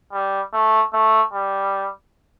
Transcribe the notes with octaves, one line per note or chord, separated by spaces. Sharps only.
G3
A3
A3
G3